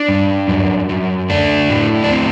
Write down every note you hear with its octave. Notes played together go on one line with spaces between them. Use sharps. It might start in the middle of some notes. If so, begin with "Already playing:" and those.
Already playing: D4
G2
F#2
F#2
A3 D4
A2
D4
C4